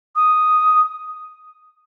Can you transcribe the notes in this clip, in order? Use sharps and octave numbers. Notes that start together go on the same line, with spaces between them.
D#6